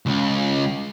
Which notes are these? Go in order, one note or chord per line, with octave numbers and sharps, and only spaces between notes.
C#2